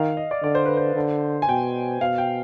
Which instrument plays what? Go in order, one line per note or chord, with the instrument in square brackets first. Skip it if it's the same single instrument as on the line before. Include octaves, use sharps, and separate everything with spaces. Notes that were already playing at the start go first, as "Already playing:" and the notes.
Already playing: [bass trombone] D#3 [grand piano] F5
[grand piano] D#5
D5
[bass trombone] D3 [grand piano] D5
[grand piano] C5
B4
C5
[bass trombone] D3
[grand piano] G#5
[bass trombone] B2 [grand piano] G5
[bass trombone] B2 [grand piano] F5
[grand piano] G5